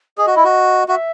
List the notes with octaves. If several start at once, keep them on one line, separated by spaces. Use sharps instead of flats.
G#4 D#5
F#4
E4
F#4
F#4 E5